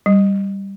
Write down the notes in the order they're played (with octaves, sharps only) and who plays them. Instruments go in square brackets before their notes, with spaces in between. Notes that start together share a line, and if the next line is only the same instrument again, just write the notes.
[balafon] G3